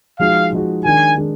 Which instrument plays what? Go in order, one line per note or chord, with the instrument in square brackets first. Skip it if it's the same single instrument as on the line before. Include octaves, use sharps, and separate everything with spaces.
[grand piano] F3 G#3 D#4 F#4 [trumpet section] F5
[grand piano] F3 G#3 D#4 F#4
[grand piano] D#3 G#3 D4 [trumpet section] G#5
[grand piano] D#3 G#3 D4